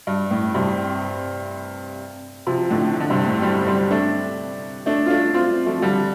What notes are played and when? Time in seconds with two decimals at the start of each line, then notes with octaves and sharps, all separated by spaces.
0.07 G2
0.31 A2
0.54 G2 C3
2.47 C3 F3
2.70 A2 D3
3.00 D3
3.10 G2 C3
3.26 A2
3.42 G3 C4
3.67 G3 C4
3.91 A3 D4
4.86 A3 D4
5.06 F4
5.10 A3 D4
5.34 C4 F4
5.66 F3 A3
5.82 D3 G3